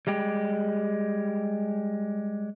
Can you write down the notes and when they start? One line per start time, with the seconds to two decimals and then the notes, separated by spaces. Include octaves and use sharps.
0.07 G3 G#3 G4